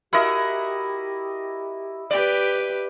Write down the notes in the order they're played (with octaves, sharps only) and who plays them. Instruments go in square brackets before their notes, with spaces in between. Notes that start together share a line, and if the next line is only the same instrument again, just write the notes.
[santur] E4 D#5 [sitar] F#4 A#4 [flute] G4
[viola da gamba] G4 B4 [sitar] D5